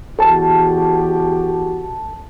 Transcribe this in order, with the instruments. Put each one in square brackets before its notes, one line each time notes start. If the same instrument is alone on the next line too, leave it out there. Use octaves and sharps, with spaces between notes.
[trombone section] E2 F#4 G4 [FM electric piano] A4 A5